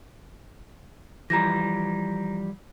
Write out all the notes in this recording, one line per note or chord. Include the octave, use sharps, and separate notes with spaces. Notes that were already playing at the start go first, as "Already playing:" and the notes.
E3 F3 G3 A#5 A#6